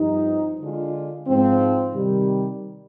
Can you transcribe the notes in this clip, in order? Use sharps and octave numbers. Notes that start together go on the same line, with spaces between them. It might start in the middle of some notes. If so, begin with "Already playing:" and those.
Already playing: G2 F3 C4 D#4
D3 G#3 D4 F4
G#2 F3 C4
C3 D#3 G3